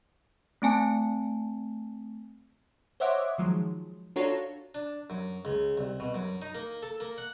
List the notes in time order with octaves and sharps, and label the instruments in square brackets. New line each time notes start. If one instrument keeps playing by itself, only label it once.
[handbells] A3 C4 G#5 A5
[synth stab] C5 C#5 D#5 E5 F#5 D6
D#3 F3 F#3 G#3
D4 F4 F#4 A4 C#5 A#5
[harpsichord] D4
F#2
C#2
C2
B2
F#2
D#4
A#3
A4
A#3
F#5